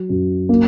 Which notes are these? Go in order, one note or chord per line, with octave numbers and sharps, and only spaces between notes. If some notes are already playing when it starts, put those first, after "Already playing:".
Already playing: F#3
F#2
A#3